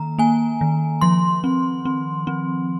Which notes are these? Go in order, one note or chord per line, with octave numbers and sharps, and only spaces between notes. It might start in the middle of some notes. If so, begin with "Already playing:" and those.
Already playing: D#3 A#3 A#5
A#3 G#5
D#3
F3 C6
C4
C4
C4